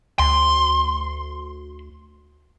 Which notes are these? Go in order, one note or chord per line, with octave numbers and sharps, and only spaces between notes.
D2 C6